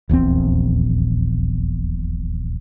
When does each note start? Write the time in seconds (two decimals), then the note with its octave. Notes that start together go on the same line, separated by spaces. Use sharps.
0.09 D#1 A#1 E2 C4